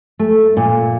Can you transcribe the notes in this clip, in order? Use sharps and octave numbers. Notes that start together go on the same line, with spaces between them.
A3
A#2